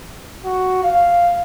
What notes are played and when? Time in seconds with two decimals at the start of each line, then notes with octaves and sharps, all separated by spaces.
0.44 F#4
0.83 F5